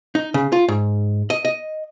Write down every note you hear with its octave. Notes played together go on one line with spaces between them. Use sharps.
D#4
C#3
F4
G#2
D#5
D#5